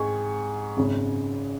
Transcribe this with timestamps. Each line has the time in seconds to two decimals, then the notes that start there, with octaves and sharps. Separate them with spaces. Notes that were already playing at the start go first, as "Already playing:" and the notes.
Already playing: G#2 G#3 G#5 C#6
0.77 G#1 F#2 C#3